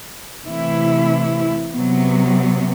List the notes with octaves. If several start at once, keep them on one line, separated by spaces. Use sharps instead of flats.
C3 E3 A3 E4
C3 F#3 B3